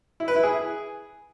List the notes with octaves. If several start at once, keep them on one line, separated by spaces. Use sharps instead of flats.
E4
B4
E4
G#4